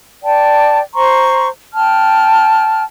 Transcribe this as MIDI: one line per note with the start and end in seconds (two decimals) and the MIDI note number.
0.23 0.81 74
0.23 0.81 79
0.23 0.81 81
0.94 1.48 72
0.94 1.48 82
0.94 1.48 84
0.94 1.48 85
1.74 2.83 79
1.74 2.83 81
1.74 2.83 89